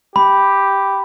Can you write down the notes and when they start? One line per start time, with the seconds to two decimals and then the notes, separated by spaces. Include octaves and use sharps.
0.16 G4 B5